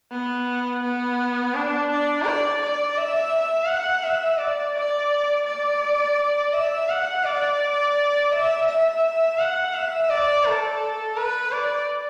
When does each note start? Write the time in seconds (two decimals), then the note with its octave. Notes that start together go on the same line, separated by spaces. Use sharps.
0.12 B3
0.83 B3
1.54 D4
1.90 D4
2.25 D5
2.62 D5
2.97 E5
3.68 F#5
4.04 E5
4.39 D5
4.75 D5
5.46 D5
6.53 E5
6.89 F#5
7.25 D5
8.32 E5
8.67 E5
9.38 F#5
9.74 E5
10.10 D5
10.45 A4
11.17 B4
11.53 D5